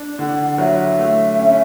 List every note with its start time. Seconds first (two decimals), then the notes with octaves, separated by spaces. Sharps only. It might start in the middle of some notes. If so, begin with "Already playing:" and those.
Already playing: D4
0.18 D3 F#5
0.58 F#3 E5
0.98 A3
1.39 C#4